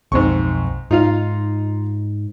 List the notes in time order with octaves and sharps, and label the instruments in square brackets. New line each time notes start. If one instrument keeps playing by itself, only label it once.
[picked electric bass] B1 F2 [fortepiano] G#2 C4 C#6
[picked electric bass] G#2 [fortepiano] D#4 F4 F5